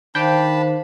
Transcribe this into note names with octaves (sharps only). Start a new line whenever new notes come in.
D#3 D4 C5 F5 G5 A5 B5